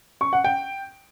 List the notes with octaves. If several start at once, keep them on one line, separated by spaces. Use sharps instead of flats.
C#6
F#5
G5